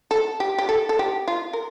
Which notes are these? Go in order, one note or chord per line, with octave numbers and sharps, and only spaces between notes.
A4
G4
G4
A4
A4
G4
F4
A#4